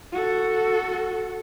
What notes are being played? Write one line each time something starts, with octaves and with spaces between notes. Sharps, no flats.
F#4 A4